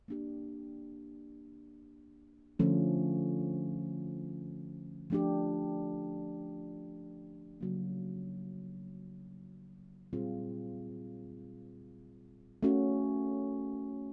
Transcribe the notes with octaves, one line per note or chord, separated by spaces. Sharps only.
A#3 D4 G4
D3 F3 A3 C#4
F3 A3 D4 G4
C#3 F#3 A#3
A#2 G3 C4 F4 G#4
A3 C#4 F#4